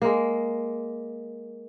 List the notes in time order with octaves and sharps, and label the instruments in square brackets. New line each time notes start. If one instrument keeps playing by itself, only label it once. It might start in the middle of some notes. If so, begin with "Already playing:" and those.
[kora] G#3 A#3